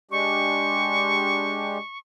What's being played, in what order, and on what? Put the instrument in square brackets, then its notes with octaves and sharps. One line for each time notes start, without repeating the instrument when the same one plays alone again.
[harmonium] G#3 D4 G4 [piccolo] C#6